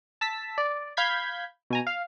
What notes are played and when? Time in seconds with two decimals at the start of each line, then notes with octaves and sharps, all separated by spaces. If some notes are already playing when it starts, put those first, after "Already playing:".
0.21 A5 E6 B6
0.58 D5
0.97 F5 B5 G6 G#6 B6
1.70 B2 G#5 A#5
1.87 F5